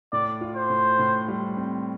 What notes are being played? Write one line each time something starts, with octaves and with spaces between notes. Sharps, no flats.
A2 D5
F4
C5
A2
A2
G3
C4